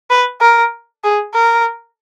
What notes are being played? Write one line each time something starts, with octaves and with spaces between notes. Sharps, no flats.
B4
A#4
G#4
A#4